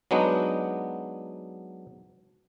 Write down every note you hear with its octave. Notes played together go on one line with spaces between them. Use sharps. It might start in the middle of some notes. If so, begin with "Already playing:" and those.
F#3 G#3 B3 D4 D#4